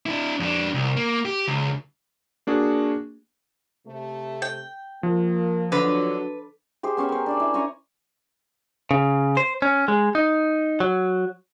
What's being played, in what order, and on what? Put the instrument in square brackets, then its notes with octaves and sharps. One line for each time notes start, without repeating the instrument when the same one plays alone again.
[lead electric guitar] D4 E4
F2 D4
C2
A#3
G4
C#2
[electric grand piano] A#3 D4 F#4 G#4
[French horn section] C3 A3
[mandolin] G5
[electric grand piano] F3 [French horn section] A#3
[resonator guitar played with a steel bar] D3 [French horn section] F#3 [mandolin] B4
[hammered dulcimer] G4 G#4 C5
B3 C#4 C5 C#5
A#4 C5
D4 D5 G#5
E4
C#4 G#5 A#5 C#6
[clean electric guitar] C#3
C5
C#4
G#3
D#4
F#3